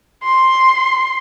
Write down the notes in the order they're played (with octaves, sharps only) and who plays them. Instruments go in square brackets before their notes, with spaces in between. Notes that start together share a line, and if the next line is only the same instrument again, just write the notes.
[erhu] C6